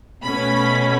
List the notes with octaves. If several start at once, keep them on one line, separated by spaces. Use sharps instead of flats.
B2 A3 C#4 B5